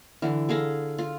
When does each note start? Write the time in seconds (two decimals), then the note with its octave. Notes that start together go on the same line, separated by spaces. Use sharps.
0.22 D3 E3
0.49 G#4 A4 F5 A#5
0.98 F4